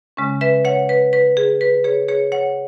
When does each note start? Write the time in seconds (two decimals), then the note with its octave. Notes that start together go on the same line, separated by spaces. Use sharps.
0.17 C#3 G#3 C#4
0.41 B4 E5
0.65 C#5 F#5
0.89 B4
1.13 B4
1.37 G#4
1.61 B4
1.84 G#4 C#5
2.08 G#4 C#5
2.32 C#5 F#5